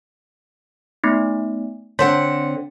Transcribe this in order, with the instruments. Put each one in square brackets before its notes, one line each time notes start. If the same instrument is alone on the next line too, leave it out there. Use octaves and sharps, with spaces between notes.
[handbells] A3 B3 D#4
[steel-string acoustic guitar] D3 C4 F#5 [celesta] C#5 C6 [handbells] B6